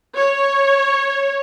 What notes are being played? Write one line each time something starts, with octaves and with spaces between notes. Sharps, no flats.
C#5